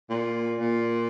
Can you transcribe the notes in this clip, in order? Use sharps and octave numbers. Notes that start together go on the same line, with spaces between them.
A#2
A#2